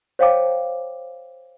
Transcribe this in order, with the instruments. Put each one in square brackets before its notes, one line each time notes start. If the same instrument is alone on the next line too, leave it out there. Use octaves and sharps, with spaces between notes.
[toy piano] C5 C#5 F5 G5 A5 D6